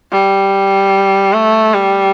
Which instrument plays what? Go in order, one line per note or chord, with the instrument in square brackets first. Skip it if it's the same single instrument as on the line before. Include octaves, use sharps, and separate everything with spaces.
[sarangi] G3
A3
G3